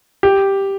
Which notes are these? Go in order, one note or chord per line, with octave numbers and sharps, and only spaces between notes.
G4